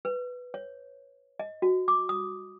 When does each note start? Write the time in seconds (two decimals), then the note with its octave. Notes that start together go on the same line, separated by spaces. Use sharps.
0.05 B4
0.54 C#5
1.39 D#5
1.62 F#4
1.88 D6
2.09 D#6